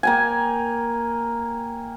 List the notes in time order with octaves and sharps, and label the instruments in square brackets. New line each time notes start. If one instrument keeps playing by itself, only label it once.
[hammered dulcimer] A#3 G5 G#5